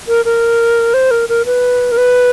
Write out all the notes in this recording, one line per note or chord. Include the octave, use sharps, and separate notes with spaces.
A#4
A#4
C5
A#4
A#4
B4
A#4
B4